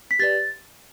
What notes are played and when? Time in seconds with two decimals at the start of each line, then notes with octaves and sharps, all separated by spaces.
0.11 B6
0.19 G4 B4 D5 A6